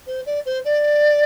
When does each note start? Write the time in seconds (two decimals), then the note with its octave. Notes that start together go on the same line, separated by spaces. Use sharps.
0.07 C5
0.26 D5
0.46 C5
0.65 D5